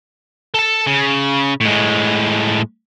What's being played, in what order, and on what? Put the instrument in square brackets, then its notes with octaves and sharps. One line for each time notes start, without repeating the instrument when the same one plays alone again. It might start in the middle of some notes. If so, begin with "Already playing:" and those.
[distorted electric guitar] A4 A5
C#3
A2 G#3